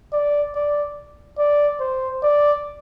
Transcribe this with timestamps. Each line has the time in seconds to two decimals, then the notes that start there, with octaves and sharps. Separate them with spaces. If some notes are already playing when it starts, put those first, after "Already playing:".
0.13 D5
0.55 D5
1.39 D5
1.80 C5
2.23 D5